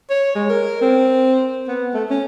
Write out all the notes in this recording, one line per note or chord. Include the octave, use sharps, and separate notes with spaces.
C#5
G#3
A#4
C4
B3
A3
C#4